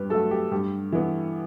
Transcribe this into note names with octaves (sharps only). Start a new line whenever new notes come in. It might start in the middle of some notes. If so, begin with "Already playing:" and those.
Already playing: G2 G4 B4
F#3 A3 A4
G4
G2 G4
E3 B3